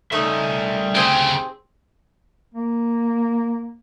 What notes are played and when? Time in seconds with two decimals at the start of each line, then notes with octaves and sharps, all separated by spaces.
0.12 G3 A3 C#4 D#4 E5
0.95 D2 C#3 C4 G4 G#4
2.55 A#3